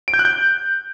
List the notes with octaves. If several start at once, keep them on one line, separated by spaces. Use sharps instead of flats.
D7
G6
F#6
G6